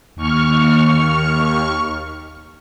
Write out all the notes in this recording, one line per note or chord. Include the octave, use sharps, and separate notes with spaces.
D#2 C#6 F6